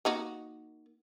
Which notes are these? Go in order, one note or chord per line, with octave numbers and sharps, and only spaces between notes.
A#3 D#4 F#4